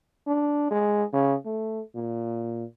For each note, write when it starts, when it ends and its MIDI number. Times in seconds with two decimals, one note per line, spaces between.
0.27 0.67 62
0.71 1.04 56
1.13 1.34 49
1.46 1.80 57
1.96 2.65 46